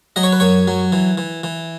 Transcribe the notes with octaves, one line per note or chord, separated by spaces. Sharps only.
F#3 D#5
C#5
B4
F#2 C#5
F#3
E3
E3
E3